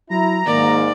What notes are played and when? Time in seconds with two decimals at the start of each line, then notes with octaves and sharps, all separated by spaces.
0.10 F#3 E4 A#5
0.47 G#2 D#3 A#3 D5